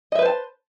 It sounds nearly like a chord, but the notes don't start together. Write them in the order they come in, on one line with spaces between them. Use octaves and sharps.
D#5 E5 B4 C5 A5